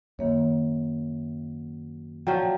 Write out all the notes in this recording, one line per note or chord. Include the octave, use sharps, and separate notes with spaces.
F#2 D#3 A#3 C#5
F3 F#3 D5 G5